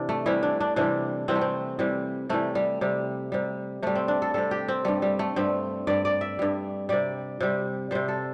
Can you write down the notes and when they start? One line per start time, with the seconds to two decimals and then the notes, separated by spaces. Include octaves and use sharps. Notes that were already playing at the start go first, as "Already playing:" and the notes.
Already playing: C3 E3 D4
0.09 A3
0.26 C3 E3 G3 E4
0.43 D4
0.60 D4
0.76 C3 E3 G3 D4
1.28 C3 E3 G3 C4
1.35 A3
1.41 C4
1.79 C3 E3 G3
2.29 C3 E3 G3 A3
2.55 G3
2.81 C3 G3
3.32 C3 G3
3.83 C3 G3 A3
3.95 C4
4.08 D4
4.22 A4
4.34 C3 G3 A4
4.51 G4
4.68 C4
4.85 G2 G3 A3
5.02 G3
5.19 A3
5.36 G2 G3 C4
5.87 G2 G3 D5
6.05 D5
6.21 E5
6.39 G2 G3
6.89 C3 G3 D5
7.41 C3 G3
7.91 C3 G3 C5
8.08 A4